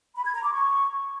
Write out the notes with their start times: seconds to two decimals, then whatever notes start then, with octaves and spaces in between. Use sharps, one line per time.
0.16 B5
0.25 G#6
0.34 A#5
0.44 D6
0.53 C#6